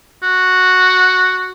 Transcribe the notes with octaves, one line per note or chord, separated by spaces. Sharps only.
F#4